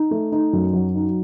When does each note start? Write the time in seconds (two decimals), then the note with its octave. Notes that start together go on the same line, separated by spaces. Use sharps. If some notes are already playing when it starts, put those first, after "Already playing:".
Already playing: D#4
0.11 A3
0.32 D#4
0.53 F#2
0.73 F#3
0.95 D#4